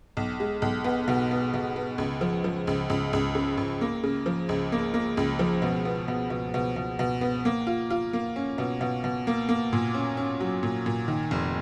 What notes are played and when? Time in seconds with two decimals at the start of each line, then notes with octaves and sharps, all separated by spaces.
0.17 B1
0.40 G#3
0.62 B1
0.84 B3
1.08 B2
1.31 B3
1.54 B2
1.76 B3
1.98 C#2
2.21 F3
2.44 F3
2.67 C#2
2.90 C#2
3.13 C#2
3.35 C#3
3.57 C#2
3.81 A#3
4.04 C#3
4.26 F3
4.49 C#2
4.72 A#3
4.94 A#3
5.17 C#2
5.39 F3
5.62 B2
5.85 B3
6.08 B2
6.30 B2
6.54 B2
6.76 B2
6.99 B2
7.21 B3
7.45 A#3
7.67 F4
7.90 F4
8.13 A#3
8.36 C#4
8.58 B2
8.81 B2
9.04 B2
9.27 A#3
9.49 A#3
9.73 A#2
9.95 C#4
10.17 C#4
10.40 F#3
10.63 A#2
10.86 A#2
11.08 D#3
11.31 F1